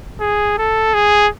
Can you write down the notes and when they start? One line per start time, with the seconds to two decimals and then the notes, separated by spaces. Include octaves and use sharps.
0.20 G#4
0.58 A4
0.94 G#4